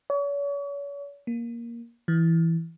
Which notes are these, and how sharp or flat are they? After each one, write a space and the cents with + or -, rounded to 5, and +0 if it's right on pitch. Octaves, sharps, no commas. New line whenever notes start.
C#5 +40
A#3 +10
E3 +0